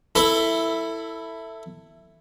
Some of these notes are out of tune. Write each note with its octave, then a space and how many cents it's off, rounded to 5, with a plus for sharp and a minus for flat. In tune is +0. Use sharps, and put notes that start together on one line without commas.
E4 +0 A4 +20